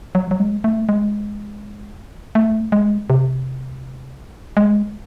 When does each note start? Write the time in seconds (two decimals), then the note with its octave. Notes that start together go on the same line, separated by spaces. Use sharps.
0.15 F#3
0.31 F#3
0.40 G#3
0.64 A3
0.89 G#3
2.35 A3
2.72 G#3
3.10 C3
4.57 G#3